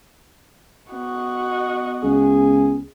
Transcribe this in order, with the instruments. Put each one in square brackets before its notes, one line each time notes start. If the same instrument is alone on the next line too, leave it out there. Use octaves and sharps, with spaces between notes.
[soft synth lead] B3 [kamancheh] F#4 D#5
[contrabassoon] C#2 [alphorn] G#4